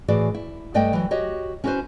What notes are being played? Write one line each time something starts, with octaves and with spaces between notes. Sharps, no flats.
A2 E3 F#4 G#4 D5
E4
G2 A3 D5 D#5 G5
E3 F#3
F#4 G4 C#5 D#5
C#4 E4 F#4 G#4 B4 C5